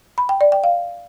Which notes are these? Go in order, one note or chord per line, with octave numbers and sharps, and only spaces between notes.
B5
G5
D5
G5
F5